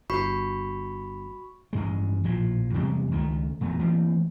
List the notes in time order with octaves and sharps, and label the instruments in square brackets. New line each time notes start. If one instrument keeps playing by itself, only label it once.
[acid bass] G1 [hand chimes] F#4 B5 C#6
[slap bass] A1 G2 G#3
A#1 A2 F3
E2 C3 G3 G#3
C#2 D#3 F3 A3
E1 E2 F#3 A3
E3 A3 A#3 C4